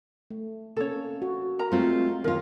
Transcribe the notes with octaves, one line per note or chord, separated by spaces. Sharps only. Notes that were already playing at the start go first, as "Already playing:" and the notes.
A3
C3 A#3 C#4 A4 C#5
F#4
A#4 A#5
G#3 A3 C4 F4
D#2 F4 A#4